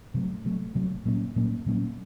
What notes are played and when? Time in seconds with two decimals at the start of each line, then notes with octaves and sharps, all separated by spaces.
0.14 C3 F#3 A3
0.45 C3 F#3 A3
0.75 C3 F#3 A3
1.05 A#2 F#3 A#3 C#4
1.36 A#2 F#3 A#3 C#4
1.66 A#2 F#3 A#3 C#4